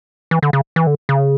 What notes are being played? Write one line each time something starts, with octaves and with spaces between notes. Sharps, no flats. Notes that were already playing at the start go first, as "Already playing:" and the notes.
E3
D3
C#3
E3
D3
C#3